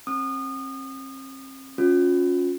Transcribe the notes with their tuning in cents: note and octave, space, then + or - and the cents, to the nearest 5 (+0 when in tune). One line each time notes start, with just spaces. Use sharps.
C4 +40 D#6 -30
C#4 +0 F4 +35